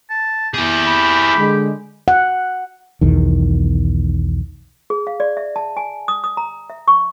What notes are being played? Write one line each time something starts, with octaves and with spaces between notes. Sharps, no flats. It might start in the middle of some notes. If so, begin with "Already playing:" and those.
A5
E4 G4 G#4
B5
D3 G#3
F#5
B1 E2 D#3
G#4
F5
D5
E5
A5
G#5
D#6
D#6
A#5
E5
C#6